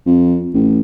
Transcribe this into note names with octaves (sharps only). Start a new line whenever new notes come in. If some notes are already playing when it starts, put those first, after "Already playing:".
F2
A1